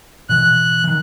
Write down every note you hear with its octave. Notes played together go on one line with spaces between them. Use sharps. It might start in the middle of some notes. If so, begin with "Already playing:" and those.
B2 E3 F#6
D#3 E3